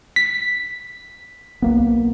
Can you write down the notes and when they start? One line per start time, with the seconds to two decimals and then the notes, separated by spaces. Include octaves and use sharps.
0.16 B6
1.62 B1 A#3 B3